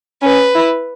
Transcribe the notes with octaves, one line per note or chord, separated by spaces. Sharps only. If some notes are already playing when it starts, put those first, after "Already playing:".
C#4 B4
E4